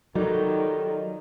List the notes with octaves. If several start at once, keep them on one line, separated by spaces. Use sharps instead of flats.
D#3 F#3 G3 D#4 F4 A4